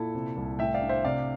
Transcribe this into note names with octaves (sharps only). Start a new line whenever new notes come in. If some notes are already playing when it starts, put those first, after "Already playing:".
Already playing: A#2 E4 A4
C3
C2
A2 E5 G5
D5 F5
D4
C5 E5
C3 D5 F5